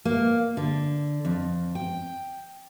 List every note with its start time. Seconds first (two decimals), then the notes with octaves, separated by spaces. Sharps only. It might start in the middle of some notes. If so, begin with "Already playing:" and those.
0.05 A#3
0.57 D3
1.25 F2
1.75 G5